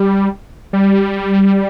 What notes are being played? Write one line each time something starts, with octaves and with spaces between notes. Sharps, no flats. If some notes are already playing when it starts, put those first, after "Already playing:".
Already playing: G3
G3